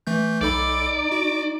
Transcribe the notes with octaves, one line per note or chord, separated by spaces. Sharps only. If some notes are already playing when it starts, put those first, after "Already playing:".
E3 A3 G6
B1 D#4 A4 D5 B5
F#4